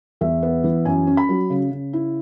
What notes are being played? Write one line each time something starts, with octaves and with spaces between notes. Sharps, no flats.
E2 E5
B3
E3
F#2 G#5
C#4
B5
F#3
C#3
C#3
E4